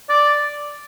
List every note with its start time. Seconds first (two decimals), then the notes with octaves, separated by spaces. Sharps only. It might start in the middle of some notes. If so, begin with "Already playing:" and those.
0.09 D5